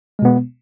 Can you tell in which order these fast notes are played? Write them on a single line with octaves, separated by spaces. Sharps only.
G#3 B2 B3